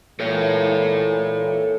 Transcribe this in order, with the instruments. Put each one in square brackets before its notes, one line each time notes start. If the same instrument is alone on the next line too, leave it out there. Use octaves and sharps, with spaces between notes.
[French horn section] A#2 E3 [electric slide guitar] A4 C#5